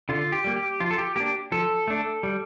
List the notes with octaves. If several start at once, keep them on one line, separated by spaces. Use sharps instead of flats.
D3 F4
G4
G3 A#3
G4
F3 F4
A4
G4
A#3 D4 G4
F3 A4
A3 D4
G3